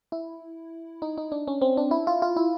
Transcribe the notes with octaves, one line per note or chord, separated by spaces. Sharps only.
E4
D#4
D#4
D4
C#4
C4
D4
E4
F4
F4
E4